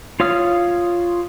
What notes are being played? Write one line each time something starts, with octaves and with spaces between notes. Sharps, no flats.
F4 C#5 F5 D#6 F6